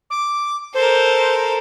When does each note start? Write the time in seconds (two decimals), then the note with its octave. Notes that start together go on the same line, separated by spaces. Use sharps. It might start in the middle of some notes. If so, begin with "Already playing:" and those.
0.10 D6
0.74 A4 A#4 C5